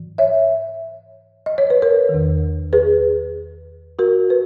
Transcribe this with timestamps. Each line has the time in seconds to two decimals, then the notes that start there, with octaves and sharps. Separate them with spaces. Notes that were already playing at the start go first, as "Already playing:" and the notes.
Already playing: G#2 E3
0.18 C#5 E5
1.46 D#5
1.58 C#5
1.70 B4
1.82 A#4 C#5
2.09 E2 D#3
2.73 G#4 B4
3.99 F#4 A#4
4.30 B4